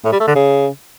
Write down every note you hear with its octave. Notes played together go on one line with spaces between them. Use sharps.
A2
G3
A3
D3
C#3